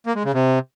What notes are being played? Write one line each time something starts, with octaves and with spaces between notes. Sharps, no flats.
A#3
G#3
C#3
C3